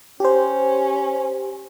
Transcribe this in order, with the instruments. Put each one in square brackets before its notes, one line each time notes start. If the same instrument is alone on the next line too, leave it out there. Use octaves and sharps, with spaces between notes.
[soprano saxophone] C#4 [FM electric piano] G4 C5